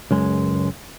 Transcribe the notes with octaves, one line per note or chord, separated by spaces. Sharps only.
C#2 F#2 G#3